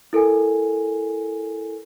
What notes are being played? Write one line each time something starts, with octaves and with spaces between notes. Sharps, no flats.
E4 A4 A#4 G#5